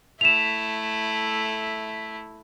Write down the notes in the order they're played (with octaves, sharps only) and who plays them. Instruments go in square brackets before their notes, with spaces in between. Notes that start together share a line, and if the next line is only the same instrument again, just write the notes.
[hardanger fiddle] A3 E4 [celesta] E7 F7